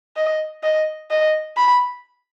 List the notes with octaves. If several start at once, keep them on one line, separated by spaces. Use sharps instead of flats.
D#5
D#5
D#5
B5